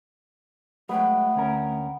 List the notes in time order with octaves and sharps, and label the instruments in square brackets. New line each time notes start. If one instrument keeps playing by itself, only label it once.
[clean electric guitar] F#3 G#3 [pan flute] A3 [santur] B3 G5
[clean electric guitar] D2 C#4 A#4